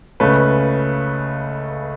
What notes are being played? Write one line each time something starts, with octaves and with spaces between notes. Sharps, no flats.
C#2 C#3 A3 C#4 B4